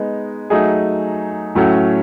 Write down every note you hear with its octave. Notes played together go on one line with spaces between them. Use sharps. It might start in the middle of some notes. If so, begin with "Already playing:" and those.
Already playing: G#3 B3 D#4
F#3 A3 D#4 G#4
A2 F#3 A3 C#4